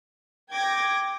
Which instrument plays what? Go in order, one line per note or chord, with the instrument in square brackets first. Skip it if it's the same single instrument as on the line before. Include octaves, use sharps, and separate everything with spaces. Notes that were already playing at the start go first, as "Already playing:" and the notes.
[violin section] G5 D6 G#6 A#6